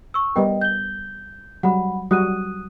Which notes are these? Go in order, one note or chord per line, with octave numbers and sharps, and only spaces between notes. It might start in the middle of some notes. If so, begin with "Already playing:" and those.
C#6 E6
G3 B3 A#4 D#5 G5
G6 G7
F#3 G3 F#5 B5
F#3 G3 F#4 D#6 F#6 D#7